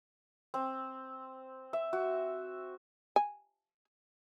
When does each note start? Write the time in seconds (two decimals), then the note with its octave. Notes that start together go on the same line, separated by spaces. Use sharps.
0.54 C4
1.73 E5
1.93 F#4
3.16 G#5